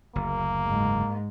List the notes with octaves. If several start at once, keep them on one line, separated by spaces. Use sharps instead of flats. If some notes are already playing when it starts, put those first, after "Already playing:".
F#1 D2 A#3
G#2